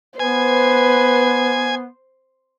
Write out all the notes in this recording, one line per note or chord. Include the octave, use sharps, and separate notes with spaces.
B3 B4 C5 G#5